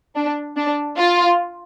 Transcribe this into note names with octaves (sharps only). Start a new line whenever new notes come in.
D4
D4
F4